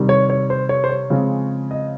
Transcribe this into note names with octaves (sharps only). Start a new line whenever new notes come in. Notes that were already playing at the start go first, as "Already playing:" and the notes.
Already playing: C3 D#3 G3
C#5
C#5
C5
C#5
C5
C#5
C#3 F3 G#3 C4
D#5